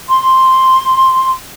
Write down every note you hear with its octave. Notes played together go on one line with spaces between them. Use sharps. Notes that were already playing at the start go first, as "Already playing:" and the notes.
C6